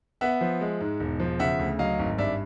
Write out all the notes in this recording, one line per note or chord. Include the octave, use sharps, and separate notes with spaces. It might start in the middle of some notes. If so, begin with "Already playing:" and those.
B3 E5 F#5
F3
G#3
G#2
E1
F3
C#3 E5 F#5
D2
F#3 D#5 F5
G#1
G2 D5 E5